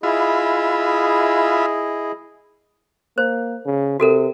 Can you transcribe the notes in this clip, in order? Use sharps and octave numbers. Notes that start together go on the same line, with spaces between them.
E4 F4 G#4 D#5 E5 B5
A#3 C5
C#3
C3 F#4 A4 A#4